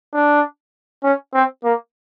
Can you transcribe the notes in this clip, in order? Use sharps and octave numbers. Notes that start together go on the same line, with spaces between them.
D4
C#4
C4
A#3